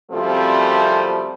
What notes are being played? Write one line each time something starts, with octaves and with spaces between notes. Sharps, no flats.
F#2 C3 F3 G3 A3 C4